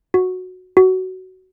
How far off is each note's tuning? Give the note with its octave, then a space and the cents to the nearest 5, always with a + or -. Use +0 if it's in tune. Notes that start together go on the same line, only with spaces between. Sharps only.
F#4 -10
F#4 +15